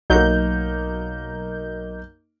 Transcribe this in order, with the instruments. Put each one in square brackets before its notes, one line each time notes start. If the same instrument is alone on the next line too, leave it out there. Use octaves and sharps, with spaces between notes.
[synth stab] B1 F#3 G6 [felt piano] A#3 D#4